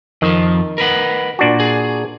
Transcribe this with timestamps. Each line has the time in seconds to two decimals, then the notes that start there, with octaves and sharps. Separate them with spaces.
0.22 F2 D#3 F3
0.78 A#4 B4 F#5
1.39 A#2 D4 F#4
1.60 G#4